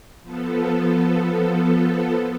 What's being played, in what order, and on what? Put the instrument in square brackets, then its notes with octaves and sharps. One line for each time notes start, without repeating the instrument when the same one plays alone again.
[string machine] F3 B3 A4